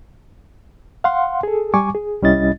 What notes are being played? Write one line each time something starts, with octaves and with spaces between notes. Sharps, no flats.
F5 F#5 C6
G#4 A4
G3 G#5 C#6 D6
G#4
C2 G3 C#4 E4 D#5 A6